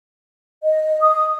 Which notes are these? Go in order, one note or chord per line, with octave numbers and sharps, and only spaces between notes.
D#5
D#6